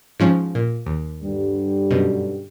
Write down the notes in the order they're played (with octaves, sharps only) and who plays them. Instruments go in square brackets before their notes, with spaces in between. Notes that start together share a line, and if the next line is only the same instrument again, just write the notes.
[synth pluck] G#2 F3 C#4
A#2
D#2
[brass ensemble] G2 D3 G3
[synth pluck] F#2 B2